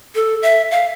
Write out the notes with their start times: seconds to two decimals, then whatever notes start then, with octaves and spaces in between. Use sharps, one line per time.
0.15 A4
0.43 E5
0.71 F5